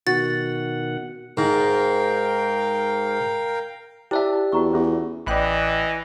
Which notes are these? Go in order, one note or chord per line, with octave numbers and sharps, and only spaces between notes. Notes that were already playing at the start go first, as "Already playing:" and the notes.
B2 D#3 F#4 F#5 A6
G#2 A#4 F5 G5
E4 G4 C5 D5 E5 A5
E2 F#4 A#5 C#6
E2 C#4 F4 G#4
A1 E3 D5 D#5 G5 B5 F#6